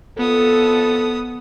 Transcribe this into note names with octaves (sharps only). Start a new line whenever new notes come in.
F2 B3 F4 A4 D#6